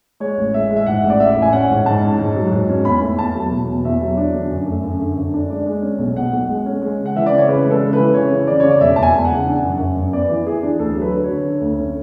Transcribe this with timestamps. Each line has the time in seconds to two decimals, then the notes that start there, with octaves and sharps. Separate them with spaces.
0.20 G#3 C#5
0.38 A1
0.54 G#3 E5
0.71 G#3
0.76 E5
0.86 G#2 F#5
1.03 A1
1.10 D5
1.20 A1 E5
1.37 A1
1.42 G#5
1.53 C#4 F#5
1.70 G#2
1.86 G#2 A5
2.02 C#4
2.19 G#2
2.36 F#3
2.52 G#2
2.69 C#4
2.85 E2 B5
3.02 A3
3.18 E2 A5
3.36 F#3
3.51 B2
3.68 E2
3.85 E2 E5
4.01 F#3
4.17 D4
4.34 D3
4.50 F#2
4.67 A3
4.84 F#2
5.00 D3
5.17 F#2
5.34 D4
5.50 G#3 D5
5.66 G#3
5.82 C#4
5.99 B1
6.16 B2 F#5
6.32 B1
6.49 G#3
6.66 C#4
6.82 G#3
6.99 C#3
7.06 F#5
7.16 E3 E5
7.26 D5
7.32 C#3
7.38 C#5
7.48 C#3 B4
7.65 G#3 B4
7.71 A4
7.81 C#3
7.93 E3 B4
8.14 C#3 C#5
8.30 C#3
8.47 C#3 D5
8.60 C#3 C#5
8.70 D5
8.81 E1 E5
8.96 E2 A5
9.02 G#5
9.13 E2
9.25 F#5
9.31 C#3
9.46 D4
9.64 F#2
9.80 F#2
9.97 F#2
10.13 B3 D5
10.29 E3
10.46 E3 G#4
10.63 D4
10.79 D2 A4
10.95 F#3
11.02 B4
11.12 D3
11.24 D3 C#5
11.45 D3
11.61 D2
11.79 C#4